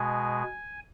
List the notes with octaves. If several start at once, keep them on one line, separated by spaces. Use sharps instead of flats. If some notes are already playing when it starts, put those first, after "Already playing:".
Already playing: B2 G#3 G#5